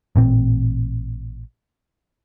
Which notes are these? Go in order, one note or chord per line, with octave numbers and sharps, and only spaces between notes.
A1 A#2 C4